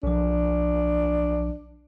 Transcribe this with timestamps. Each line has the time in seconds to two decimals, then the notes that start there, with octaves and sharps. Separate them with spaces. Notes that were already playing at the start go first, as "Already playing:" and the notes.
0.03 B1 F3 D4